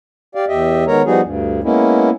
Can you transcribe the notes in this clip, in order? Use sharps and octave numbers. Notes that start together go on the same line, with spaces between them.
G4 D5 F5
E2 G4 D#5 E5
D#3 G#3 B3 A#4 C#5 A#5
F3 G3 B3 D#4 F#4 G#4
D2 G2
G#3 A#3 B3 C#4 E4